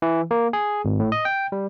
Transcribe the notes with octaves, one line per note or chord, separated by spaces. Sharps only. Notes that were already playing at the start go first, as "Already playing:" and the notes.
E3
A#3
G#4
G#1
A2
D#5
G5
G3